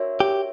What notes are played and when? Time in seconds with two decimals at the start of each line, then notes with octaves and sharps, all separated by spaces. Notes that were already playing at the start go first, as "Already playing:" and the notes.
Already playing: D4 F#4 A#4 C#5 E5
0.20 G4